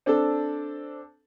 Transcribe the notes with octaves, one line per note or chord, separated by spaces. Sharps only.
C4 D4 A4